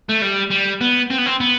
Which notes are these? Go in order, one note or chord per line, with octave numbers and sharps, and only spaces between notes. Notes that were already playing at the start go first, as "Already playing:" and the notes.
A3
G3
G3
B3
C4
B3
C4
B3